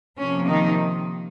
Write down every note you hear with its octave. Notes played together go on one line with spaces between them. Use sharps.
C3 F3 A#3 C#4
D#3 D#4